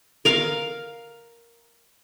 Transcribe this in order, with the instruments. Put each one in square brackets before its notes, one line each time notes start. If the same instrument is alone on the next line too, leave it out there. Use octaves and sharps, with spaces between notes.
[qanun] A#4 F5